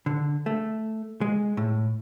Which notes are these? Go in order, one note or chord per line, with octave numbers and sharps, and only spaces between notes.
D3
A3
G#3
A2